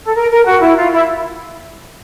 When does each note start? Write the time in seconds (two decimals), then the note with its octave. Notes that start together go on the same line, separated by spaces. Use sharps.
0.04 A4
0.15 A#4
0.30 A#4
0.45 F#4
0.61 E4
0.76 F4
0.91 E4